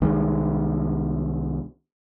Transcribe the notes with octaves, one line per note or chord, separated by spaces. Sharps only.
C2 D#3 G#3